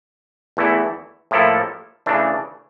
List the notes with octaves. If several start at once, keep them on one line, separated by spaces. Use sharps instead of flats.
E2 E3 A3 E4
A2 F3 A#3 E4 A4
C#3 E3 A3 D4